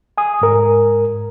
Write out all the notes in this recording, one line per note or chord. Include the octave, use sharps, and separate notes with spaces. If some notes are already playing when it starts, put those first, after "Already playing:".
G#5 D#6
G#2 A#4